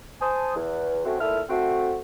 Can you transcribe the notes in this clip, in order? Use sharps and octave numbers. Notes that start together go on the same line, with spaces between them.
C5 G#5 A5 D#6
E2
A3 C4 C#4 F#4
A#2 E4 A4 F6
A3 C4 F#4